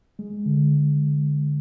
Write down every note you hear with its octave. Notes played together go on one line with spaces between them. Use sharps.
G#3
D3